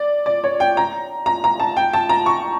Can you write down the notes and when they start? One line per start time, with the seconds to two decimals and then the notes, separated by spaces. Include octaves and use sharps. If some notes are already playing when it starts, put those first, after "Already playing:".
Already playing: D5
0.26 D5
0.44 C#5
0.60 G5
0.77 A#5
1.26 A#5
1.44 A#5
1.60 A5
1.77 G5
1.93 A5
2.09 A#5
2.26 C#6